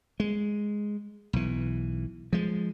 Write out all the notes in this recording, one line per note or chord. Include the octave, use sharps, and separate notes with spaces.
G#3
B1 E3
F3 G#3